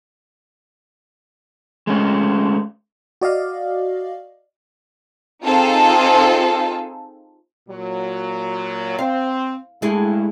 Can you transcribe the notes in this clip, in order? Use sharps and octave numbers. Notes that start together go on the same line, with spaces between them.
G#3 A3 C#4
F#4 D5 D#5 F5
C4 D#4 F4 G#4 A4
A#2 F#3
C4 F5
G2 G#3 A3 E4 G#4